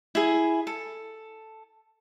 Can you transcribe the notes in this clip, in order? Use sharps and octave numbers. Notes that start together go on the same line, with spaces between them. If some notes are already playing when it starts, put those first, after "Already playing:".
E4 G#4
A4